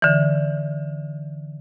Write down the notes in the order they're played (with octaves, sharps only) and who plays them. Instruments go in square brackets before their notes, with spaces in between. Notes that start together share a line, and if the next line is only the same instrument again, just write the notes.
[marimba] D3 E3